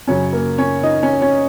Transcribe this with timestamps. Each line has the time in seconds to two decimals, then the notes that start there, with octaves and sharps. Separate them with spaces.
0.07 F#2 C#3 F#3 C#4 C#5
0.33 A#3 A#4
0.58 C#4 C#5
0.83 D#4 D#5
1.03 C#4 C#5
1.21 C#4 C#5